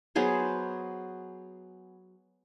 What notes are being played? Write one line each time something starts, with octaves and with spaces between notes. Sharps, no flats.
F#3 B3 G#4 C5